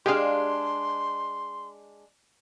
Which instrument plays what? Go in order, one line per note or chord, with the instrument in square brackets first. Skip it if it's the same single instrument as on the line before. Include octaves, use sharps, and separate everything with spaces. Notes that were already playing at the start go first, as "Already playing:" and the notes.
[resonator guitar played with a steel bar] G#3 D4 [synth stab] G4 G#4 F5 [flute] C6